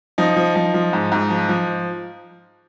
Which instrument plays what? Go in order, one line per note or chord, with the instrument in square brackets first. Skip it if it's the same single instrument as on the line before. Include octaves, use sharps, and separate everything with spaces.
[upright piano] F3 D#4
F3
F3
F3
G#2
G#2
F3
F3